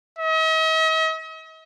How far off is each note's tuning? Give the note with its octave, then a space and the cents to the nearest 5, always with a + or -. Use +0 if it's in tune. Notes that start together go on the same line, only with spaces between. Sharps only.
D#5 +45